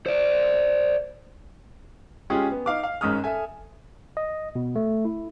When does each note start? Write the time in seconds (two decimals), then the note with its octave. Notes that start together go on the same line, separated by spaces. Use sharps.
0.06 C5 D5
2.30 G#3 C#4 F4 G4 G#4
2.51 B3
2.66 D#4 F5 D6
2.83 F5
3.01 G#1 G#2 C#4 D#6 F6
3.24 A4 E5 G#5
4.17 D#5
4.55 B2
4.76 A3
5.05 E4